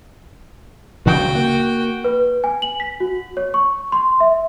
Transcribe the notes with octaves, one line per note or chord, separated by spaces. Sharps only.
D2 C#3 G3 F#4 G5
A#3
B4
G#5
F#7
B6
F#4
C#5
C#6
C6
E5